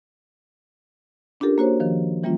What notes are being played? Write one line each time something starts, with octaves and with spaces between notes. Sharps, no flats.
C#4 D4 F4 G4 A4 A#4
A#3 F#4 C5 C#5
D#3 F3
E3 G3 A#3 C#4 F4